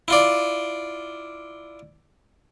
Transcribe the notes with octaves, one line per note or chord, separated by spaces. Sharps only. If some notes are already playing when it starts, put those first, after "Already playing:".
E4 F4 D5